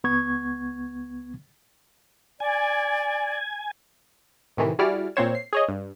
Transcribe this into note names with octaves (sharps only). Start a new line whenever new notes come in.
C#2 B3 C#6 G#6
D5 G#5
A2 C3 D#3 E3
G3 E4 F#4 G#4 D5 F6
A#2 A#3 C4 C5 C#5 E7
C7
G#4 C#5 D#5
G2